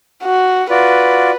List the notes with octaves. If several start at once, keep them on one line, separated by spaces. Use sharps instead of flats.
F#4
F4 F#4 B4 D5